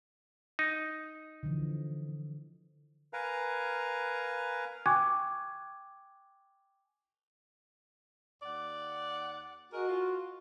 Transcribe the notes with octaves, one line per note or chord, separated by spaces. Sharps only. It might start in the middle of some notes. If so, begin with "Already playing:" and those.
D#4
D3 E3 F3
A#4 B4 F5 G#5 A#5
G5 G#5 C#6 D6 F#6 G#6
D#2 D5 F#5
F#4 G#4 A#4 D#5
F4